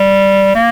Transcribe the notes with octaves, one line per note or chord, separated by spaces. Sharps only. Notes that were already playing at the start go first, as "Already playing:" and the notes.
Already playing: G3
A#3